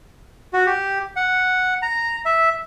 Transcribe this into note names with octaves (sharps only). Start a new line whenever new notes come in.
F#4
G4
F#5
A#5
E5